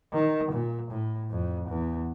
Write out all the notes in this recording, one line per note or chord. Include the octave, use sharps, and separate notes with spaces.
D#3
A#2
A2
F2
E2